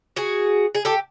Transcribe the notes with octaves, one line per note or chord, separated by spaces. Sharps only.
F#4 G#4
G#4
G4 A4